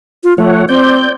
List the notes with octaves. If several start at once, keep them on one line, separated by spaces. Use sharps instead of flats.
F4
F3 A3 C#5 F#5
C4 D5 G6